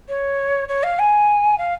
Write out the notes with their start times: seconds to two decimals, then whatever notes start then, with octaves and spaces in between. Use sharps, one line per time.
0.08 C#5
0.68 C#5
0.83 F5
0.99 G#5
1.58 F5